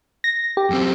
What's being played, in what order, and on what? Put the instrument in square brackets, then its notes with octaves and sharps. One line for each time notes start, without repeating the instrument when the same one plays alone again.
[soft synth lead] A#6
G4
[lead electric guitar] F#2 C4